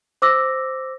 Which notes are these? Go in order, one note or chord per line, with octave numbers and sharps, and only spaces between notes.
C5 D6 E6 A#6